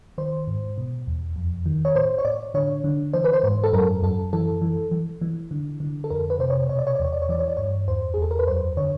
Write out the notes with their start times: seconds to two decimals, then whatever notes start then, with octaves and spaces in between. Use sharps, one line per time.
0.18 D#3 C5
0.47 G#2
0.78 B2
1.07 E2
1.36 F2
1.66 D#3
1.85 C#5
1.95 A2 C5
2.18 C#5
2.25 A2 D5
2.54 D3 C#5
2.84 D3
3.13 E3 C5
3.24 B4
3.33 C5
3.44 G#2 C5
3.64 A4
3.73 F#2 A#4
4.02 F#2 A4
4.33 E3 A4
4.62 E3
4.91 E3
5.21 E3
5.51 D3
5.80 D3
6.04 A4
6.10 F2 A#4
6.30 B4
6.39 C3 C5
6.50 C#5
6.69 B2 C#5
6.79 D5
6.87 C#5
6.95 D5
7.00 E2 C#5
7.13 D5
7.22 C#5
7.29 E3 D5
7.39 C#5
7.48 D5
7.57 G2 C#5
7.88 E2 C5
8.14 G#4
8.18 E2 A4
8.31 A#4
8.39 B4
8.47 F#2 C5
8.77 D3 C#5